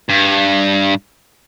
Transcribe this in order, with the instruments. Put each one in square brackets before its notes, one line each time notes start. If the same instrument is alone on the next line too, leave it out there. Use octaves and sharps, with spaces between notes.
[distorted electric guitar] G2